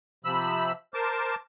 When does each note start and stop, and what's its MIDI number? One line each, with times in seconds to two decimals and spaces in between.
0.25 0.72 48
0.25 0.72 53
0.25 0.72 83
0.25 0.72 88
0.94 1.35 70
0.94 1.35 72
0.94 1.35 81
0.94 1.35 86